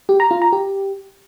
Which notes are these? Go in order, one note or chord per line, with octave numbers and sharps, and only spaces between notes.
G4
A#5
F4
A#5
G4